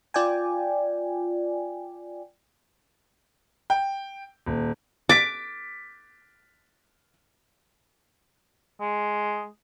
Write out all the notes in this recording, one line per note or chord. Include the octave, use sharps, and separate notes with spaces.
F4 D5 G5 G#5
G5
D#1
D6 A6 B6 D7
G#3